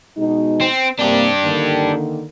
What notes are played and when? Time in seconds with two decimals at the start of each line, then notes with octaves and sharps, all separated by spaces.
0.18 B2 G#3 D#4
0.61 C4
0.99 C3 A#3 C4 D4 G4
1.44 D3 D#3 A#3